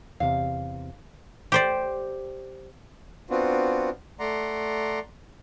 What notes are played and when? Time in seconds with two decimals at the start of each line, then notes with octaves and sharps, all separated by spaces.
0.20 E2 C3 F5
1.52 G4 C5 D5
3.30 B3 C4 D4 F4 F#4
4.19 A3 D5 F#5 A#5 C6